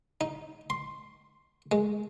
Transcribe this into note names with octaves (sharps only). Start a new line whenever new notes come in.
D#4
C6
G#3